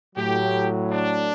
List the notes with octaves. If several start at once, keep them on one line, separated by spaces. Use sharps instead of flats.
A2 F#3 G4
D4